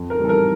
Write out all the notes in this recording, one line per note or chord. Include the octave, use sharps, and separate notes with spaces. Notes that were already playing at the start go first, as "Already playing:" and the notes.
Already playing: F2
A#4
E3 G3 A4
A#4